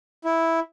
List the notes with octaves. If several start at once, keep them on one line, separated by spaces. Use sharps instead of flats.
E4